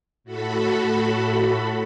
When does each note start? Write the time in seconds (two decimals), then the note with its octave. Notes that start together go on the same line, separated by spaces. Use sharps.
0.24 A2 F#4 A4 B5